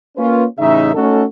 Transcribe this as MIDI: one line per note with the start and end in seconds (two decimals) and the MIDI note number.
0.17 0.44 58
0.17 0.44 61
0.17 0.44 65
0.17 0.44 71
0.59 0.90 33
0.59 0.90 49
0.59 0.90 63
0.59 0.90 76
0.94 1.23 57
0.94 1.23 61
0.94 1.23 63
0.94 1.23 66
0.94 1.23 69